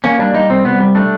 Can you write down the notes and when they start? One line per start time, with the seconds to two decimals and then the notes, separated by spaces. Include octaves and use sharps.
0.04 A#3 C#4
0.19 G3 D4
0.34 G3 D#4
0.50 C2 C4
0.64 C2 B3
0.80 G3
0.95 A3 D4